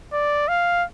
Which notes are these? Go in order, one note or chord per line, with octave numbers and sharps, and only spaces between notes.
D5
F5